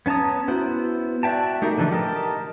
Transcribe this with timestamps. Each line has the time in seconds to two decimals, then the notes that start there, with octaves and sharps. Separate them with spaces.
0.06 B3 C#4 A5 A#5 D#6
0.48 B3 E4 F#4 C5
1.23 F#4 D5 E5 G5 A5
1.62 A3 D#4 G4 A#4
1.78 D3 E3 F3 G#3 D4
1.91 G4 A#4 D#5 A5